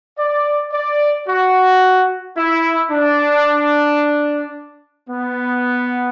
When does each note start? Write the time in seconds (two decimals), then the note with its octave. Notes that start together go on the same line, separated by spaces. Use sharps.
0.19 D5
0.73 D5
1.28 F#4
2.37 E4
2.91 D4
5.10 B3